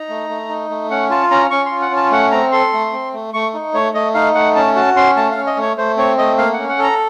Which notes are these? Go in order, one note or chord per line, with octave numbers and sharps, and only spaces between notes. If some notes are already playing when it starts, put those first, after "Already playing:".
Already playing: D#4 A#5
A3
A3
D#4
A3
C#4 F#5
F4 A5
C#4 A#5
C#4 C#6
F4 C6
F#5
C#4
A5
A3 F#5
C4 A#5
A4 C6
A3
C4
A3
A3 C#6
D#4
A3 C#5
A3 D#5
D#4 F5
A3 F#5
C#4 A5
F#4 A5
C#4 C6
A3 A5
C#4 F5
D#5
A3 C#5
A3 C5
C4 C#5
A3 D#5
A#3 F5
C#4 F#5
F#5
A4 A#5